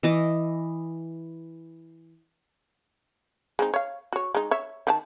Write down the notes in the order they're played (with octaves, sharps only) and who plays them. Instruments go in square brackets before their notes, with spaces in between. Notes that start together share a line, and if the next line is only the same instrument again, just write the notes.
[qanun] E3 D#5 D6
[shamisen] G#3 C4 D#4
C#5 F5
F#4 C#5
G#3 D#4
C#5 E5
D#3 F#4 A5